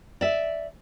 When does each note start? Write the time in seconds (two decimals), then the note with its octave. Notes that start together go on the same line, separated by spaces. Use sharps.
0.21 D5 E5